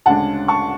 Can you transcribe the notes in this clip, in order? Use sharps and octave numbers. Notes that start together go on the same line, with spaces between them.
D2 C#3 G#3 D4 F#5 A5
A5 C#6